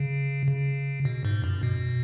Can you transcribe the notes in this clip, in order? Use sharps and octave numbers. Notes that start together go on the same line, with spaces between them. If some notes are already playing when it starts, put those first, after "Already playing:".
Already playing: C#3
C#3
B2
G#2
F#2
B2